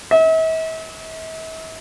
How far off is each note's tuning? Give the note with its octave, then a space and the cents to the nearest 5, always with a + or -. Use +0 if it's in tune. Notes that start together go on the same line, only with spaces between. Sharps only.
E5 -45